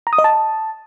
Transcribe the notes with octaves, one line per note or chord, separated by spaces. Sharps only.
A#5
D#6
D#5
A5